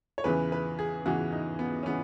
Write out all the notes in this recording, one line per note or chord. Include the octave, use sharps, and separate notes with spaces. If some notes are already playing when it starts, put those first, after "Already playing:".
C#5
E2 C#3 E3 B4
B4
G#4
E2 C#3 E3 F#4
D#4
B3
C#4
C#3 E3 B3